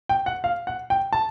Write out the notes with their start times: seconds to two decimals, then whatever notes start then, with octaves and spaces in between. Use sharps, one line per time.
0.09 G5
0.26 F#5
0.44 F5
0.67 F#5
0.90 G5
1.13 A5